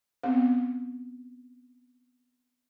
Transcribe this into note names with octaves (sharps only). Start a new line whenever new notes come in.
B3 C4